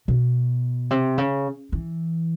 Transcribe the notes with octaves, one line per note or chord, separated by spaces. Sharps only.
B2
C3
C#3
E3